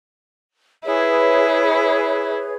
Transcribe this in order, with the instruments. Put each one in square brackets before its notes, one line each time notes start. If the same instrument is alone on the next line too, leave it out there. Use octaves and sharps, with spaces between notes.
[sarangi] E4 [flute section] G#4 B4 C#5